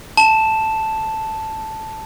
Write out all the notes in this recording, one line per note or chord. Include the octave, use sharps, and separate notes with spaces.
A5 E7